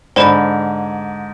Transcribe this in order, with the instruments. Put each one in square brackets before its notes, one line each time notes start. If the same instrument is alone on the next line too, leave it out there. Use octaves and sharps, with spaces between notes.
[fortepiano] G#2 D3 [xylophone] C5 D5 B5